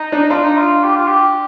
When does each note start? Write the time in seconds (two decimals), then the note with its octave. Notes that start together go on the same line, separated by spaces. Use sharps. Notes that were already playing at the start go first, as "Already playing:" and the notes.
Already playing: D#4
0.12 D4
0.30 D4 F4
0.44 D#4
0.58 F4
0.84 G4
0.96 F4
1.08 G4